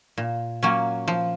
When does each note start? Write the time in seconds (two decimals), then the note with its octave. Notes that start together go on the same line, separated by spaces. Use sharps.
0.18 A#2
0.63 F#3 A#3 C#4
1.08 F3